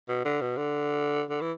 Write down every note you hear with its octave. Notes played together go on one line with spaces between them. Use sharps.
B2
D3
B2
D3
D3
E3